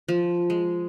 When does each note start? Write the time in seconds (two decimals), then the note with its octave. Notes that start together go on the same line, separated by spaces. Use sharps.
0.08 F3
0.50 G#3